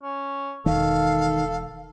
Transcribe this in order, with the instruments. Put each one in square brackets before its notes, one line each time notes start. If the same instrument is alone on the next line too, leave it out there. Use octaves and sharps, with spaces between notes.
[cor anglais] C#4
[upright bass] E1 E3 [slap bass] D#3 [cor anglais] A4 [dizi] F5